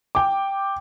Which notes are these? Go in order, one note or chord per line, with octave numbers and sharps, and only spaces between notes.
G5 D6